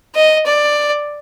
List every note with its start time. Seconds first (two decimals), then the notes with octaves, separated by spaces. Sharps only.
0.15 D#5
0.46 D5